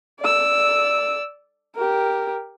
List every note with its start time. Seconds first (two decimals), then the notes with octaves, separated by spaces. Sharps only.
0.20 D5 E6
1.76 G4 A#4